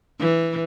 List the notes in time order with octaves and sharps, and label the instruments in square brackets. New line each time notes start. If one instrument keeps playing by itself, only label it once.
[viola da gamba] E3